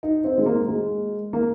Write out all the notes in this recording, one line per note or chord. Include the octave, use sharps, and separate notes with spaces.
D#4
C4
G#3
A#3
G#3
A#3